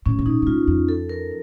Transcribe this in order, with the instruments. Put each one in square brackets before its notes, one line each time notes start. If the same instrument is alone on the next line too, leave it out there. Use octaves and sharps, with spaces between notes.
[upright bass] A2 [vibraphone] C#4
[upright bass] C3
[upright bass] A#2 [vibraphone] D#4
[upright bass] A#2
[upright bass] A2 [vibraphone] F4
[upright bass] F2
[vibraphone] A4
A#4